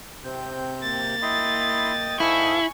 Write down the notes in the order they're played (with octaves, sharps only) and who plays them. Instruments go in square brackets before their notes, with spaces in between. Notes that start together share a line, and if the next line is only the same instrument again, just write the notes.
[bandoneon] C3 G6 [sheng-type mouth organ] C4
[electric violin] A#3 A6
[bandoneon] E4 B5 C6 [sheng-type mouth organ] D#5 G5 D#6
[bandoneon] G#2 A4 F5 [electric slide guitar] E4 [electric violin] G#5 C#6